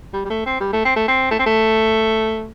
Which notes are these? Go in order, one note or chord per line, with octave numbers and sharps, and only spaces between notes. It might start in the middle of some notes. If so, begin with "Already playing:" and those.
G3
G3
A3
C4
G3
A3
C4
A3
C4
A3
C4
A3